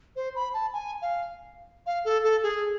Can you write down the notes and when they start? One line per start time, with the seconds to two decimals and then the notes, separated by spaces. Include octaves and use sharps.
0.16 C5
0.36 B5
0.54 A5
0.73 G#5
1.02 F5
1.86 F5
2.05 A4
2.24 A4
2.43 G#4